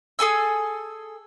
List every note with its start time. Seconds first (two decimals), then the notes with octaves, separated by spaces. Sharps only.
0.19 G#4 A4 G#5 E6